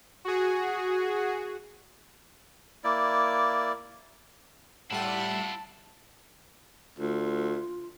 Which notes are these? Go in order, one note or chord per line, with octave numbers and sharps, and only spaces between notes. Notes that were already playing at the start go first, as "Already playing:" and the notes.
F#4 G#4
A#3 E4 D5
A2 G3 E4 F4 E5 F#5 A5
D2 F4